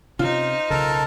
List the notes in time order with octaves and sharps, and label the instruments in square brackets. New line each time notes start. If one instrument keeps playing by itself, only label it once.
[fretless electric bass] C3 C#4 [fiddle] D#4 C5 [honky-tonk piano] F4
[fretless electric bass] B1 C#3 [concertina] A4 A#4 A5